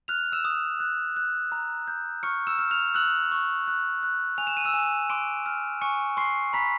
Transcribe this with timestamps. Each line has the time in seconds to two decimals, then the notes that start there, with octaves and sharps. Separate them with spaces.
0.08 F6 F#6 F7
0.32 E6 E7
0.45 D#6
0.80 F#6
1.16 F#6
1.52 A#5
1.88 G6
2.23 C#6 F6 C#7
2.47 E6 E7
2.59 F6
2.71 F6 F7
2.95 E6 F#6 F#7
3.32 C#6
3.67 F#6
4.03 F#6
4.38 G#5 F7
4.47 E7
4.57 D#7
4.65 E6 E7
4.74 G#5
5.10 C6 D6 D7
5.46 F6
5.81 G#5 C#6 C#7
6.17 C6 C#6 C7
6.53 A#5 B5 B6